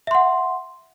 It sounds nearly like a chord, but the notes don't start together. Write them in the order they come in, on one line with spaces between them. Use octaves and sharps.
E5 C6 F#5